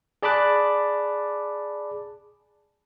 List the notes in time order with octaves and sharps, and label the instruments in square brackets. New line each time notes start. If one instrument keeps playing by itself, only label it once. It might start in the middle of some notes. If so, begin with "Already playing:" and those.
[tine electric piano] G#4 D5 A5 B5 D6 F#6